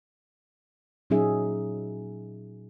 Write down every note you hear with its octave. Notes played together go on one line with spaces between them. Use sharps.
A#2 F#3 C#4 D#4 G#4 E5